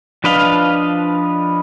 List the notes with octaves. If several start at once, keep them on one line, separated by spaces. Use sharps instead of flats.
F3 D4 B4 D#5 F5